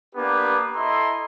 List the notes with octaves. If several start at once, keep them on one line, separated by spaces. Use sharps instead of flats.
A#3 B3 D4 G4 B4
E4 A4 D#5 A#5 C6